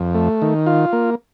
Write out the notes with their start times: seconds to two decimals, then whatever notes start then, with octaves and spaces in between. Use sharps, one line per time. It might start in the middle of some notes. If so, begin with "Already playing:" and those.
Already playing: F2
0.15 A3
0.42 D#3
0.66 F4
0.93 A#3